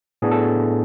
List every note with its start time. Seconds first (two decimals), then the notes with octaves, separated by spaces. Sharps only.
0.22 A2 F#3 B3 D4 G#4
0.31 A4